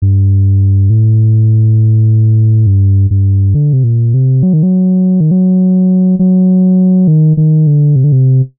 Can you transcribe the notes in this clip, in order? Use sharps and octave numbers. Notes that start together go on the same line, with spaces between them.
G2
A2
G2
G2
D3
C3
A#2
C3
F#3
D#3
F#3
D#3
F#3
F#3
D#3
D#3
D3
C3
D3
C3